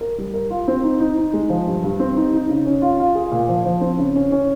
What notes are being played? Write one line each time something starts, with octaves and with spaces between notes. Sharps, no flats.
A#4
G3
A#4
F4
C4
D#4
D#4
D#4
G#3
F3
G2
G2
C4
D#4
D#4
C#3
C#4
F4
F4
G#4
A#2
F3
F3
C4
C#3
C#4
C#4